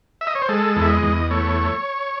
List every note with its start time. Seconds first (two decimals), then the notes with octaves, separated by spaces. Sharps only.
0.21 E5
0.27 D#5
0.35 C#5
0.42 C5
0.49 G#3 A4
0.76 E2
0.82 E5
0.90 D#5
1.03 E2
1.31 A3 C#5